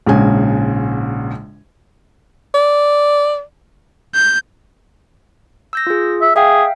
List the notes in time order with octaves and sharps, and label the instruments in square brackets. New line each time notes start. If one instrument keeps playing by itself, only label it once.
[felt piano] A#1 G#2 C#3 G#5
[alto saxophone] D5
[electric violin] G6
[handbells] E6 G6 A#6
F4 G#4
[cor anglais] E5
[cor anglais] G#4 [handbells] E5 F5 G5